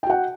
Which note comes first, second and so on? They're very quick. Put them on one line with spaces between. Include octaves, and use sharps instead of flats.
G5 F#4 F#5